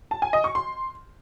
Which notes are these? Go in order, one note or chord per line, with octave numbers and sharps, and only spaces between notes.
A5
G#5
D#5
C#6
C6